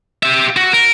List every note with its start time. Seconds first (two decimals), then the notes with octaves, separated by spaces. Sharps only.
0.23 G4 E5
0.56 F#4
0.73 A#4